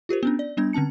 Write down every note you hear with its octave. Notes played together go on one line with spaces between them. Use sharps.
F4 G4 A#4 C5
B3 C#4 D4
D5
G3 B3 D4 G#6
D3 C4 C#4 A5 C#7